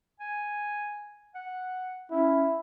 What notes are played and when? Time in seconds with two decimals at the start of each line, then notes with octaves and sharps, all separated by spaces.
0.20 G#5
1.35 F#5
2.11 C#4 E4